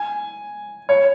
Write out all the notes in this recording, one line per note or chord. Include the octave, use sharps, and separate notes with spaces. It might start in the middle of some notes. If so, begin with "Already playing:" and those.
Already playing: G#5
C#5